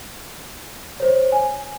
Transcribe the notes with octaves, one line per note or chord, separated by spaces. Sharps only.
C5 C#5
G#5